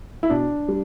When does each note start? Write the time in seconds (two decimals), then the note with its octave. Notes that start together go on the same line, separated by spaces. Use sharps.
0.23 E4
0.30 B2 D4
0.68 G3